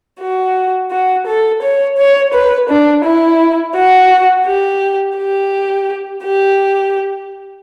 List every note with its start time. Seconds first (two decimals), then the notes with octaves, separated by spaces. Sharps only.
0.20 F#4
0.91 F#4
1.27 A4
1.62 C#5
1.97 C#5
2.33 B4
2.68 D4
3.04 E4
3.75 F#4
4.46 G4
5.17 G4
6.24 G4